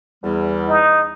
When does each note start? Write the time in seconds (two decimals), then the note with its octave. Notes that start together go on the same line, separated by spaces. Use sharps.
0.23 E2 G3
0.68 D#4